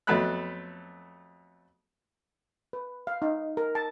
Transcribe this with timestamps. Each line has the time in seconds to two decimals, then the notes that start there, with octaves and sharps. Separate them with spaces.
0.07 F2 F#3 A3 B3 B5 F#6
2.73 B4
3.07 F5
3.22 D#4
3.57 A#4
3.75 A5